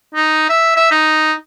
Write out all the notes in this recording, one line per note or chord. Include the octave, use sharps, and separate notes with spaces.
D#4
E5
E5
D#4